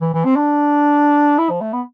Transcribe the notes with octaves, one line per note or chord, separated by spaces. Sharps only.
E3
E3
C4
D4
E4
F3
A3
B3